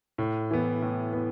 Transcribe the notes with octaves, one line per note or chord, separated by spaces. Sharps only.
A2
E3 B3
A2
B3